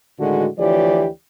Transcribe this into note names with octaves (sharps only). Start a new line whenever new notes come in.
A2 D3 D#3 G#3 F#4
D2 E3 F3 G4 C#5 D5